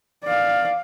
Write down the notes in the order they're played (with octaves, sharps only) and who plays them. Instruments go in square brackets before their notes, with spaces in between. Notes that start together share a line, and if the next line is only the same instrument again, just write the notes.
[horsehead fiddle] D5 F5